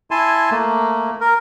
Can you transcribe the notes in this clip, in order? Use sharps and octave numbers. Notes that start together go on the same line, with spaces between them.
E4 G#5 A5 C6
A3 A#3
A#4